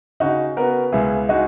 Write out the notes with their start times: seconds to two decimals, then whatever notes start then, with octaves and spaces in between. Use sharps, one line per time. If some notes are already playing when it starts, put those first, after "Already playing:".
0.20 C#3 D#4 F#4
0.57 B3 F#4 A#4
0.92 C#2 E4 G#4
1.29 G#3 D#4 F#4